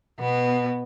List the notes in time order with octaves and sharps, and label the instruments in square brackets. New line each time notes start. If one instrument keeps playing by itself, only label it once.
[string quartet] B2 B3